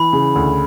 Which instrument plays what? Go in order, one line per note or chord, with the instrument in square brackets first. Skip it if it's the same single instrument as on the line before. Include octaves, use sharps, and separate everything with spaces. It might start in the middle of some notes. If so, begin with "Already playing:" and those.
Already playing: [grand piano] E3 [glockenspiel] B5
[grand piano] C#3
D2